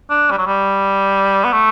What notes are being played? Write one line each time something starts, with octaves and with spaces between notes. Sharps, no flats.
D4
G3
F#3
G3
B3
A3